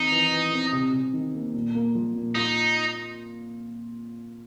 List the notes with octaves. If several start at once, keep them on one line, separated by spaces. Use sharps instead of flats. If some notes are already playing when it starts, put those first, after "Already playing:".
Already playing: D#3 C4 D#4
E3
E3
C4
C3
C3
D#3
A#3
A#2
A#3
F3
A#2
D#4 F4